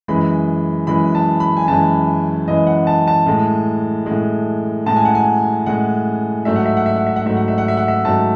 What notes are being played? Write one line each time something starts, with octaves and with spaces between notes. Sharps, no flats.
F#2 E3 G#3 B5
F#2 E3 G#3 B5
A5
B5
G#5
F#2 E3 G#3 A5
F#2 E3 G#3 D#5
F#5
A5
A5
A2 G#3
A2 G#3
A2 G#3 A5
G#5
F#5
G#5
A2 G#3 F#5
G#2 F#3 A3 E5
F#5
E5
F#5
E5
F#5
E5
F#5
G#2 F#3 A3 E5
F#5
E5
F#5
E5
F#5
E5
G#2 F#3 A3 A5